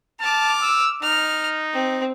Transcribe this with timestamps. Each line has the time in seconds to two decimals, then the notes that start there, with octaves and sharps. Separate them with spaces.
0.20 A5 D6 F6
0.62 E6
1.03 D#4 F6
1.73 C4